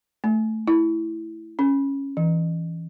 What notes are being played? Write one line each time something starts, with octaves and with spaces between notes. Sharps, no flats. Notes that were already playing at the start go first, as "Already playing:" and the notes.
A3
E4
C#4
E3